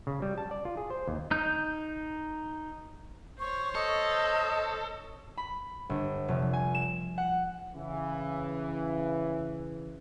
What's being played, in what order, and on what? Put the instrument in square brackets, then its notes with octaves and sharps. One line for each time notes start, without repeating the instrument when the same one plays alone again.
[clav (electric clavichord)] C#3
G3
A5
D5
F4
G#4
C5
D#2
[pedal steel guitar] D#4 G6
[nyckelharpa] C5 C#5 [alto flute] C#6
[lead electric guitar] A4 [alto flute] D#5
[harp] B5
G1
F1
G#5
E7
F#5
[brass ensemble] C#3 E3